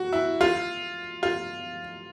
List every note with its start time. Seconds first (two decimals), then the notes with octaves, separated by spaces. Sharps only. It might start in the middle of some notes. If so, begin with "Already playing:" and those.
Already playing: F#4
0.13 E4
0.41 F4
1.23 F4